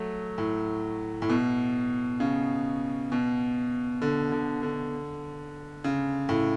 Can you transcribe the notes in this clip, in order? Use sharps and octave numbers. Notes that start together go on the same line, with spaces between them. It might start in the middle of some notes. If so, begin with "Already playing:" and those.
Already playing: F#3 A3
A2
A2
B2
C#3
B2
D3
D3
D3
C#3
A2